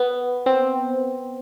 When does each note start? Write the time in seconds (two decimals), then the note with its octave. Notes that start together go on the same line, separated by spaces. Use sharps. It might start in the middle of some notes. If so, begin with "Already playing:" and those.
Already playing: B3
0.46 C4